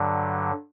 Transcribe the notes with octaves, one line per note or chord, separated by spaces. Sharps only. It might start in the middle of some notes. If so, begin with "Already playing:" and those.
Already playing: G2 D3 F#3